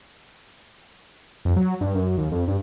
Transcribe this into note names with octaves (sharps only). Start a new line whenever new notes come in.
F2
F#3
G2
F#2
D#2
F2
G2